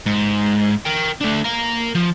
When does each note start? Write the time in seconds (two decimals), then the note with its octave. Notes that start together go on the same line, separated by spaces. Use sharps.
0.06 G#2
0.85 A#4 G5
1.21 A3 D4
1.44 A#4 F5
1.95 F3